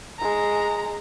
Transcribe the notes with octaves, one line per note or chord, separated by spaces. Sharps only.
G#3 A#5